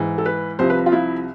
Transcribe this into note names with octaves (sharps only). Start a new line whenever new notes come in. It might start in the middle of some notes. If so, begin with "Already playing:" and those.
Already playing: G#2 E3
A4
B4
C2 C3 F3 C5
B4
F4
E4